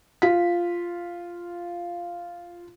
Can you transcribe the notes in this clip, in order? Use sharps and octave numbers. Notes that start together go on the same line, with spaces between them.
F4 B6